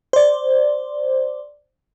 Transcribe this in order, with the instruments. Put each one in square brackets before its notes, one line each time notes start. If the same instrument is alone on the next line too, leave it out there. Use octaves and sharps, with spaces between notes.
[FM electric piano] C5 D5